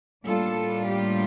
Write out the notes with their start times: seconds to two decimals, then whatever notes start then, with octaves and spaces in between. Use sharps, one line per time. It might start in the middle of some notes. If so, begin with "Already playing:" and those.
0.25 A2 G3 A#3 D4 F4 A4
0.87 G4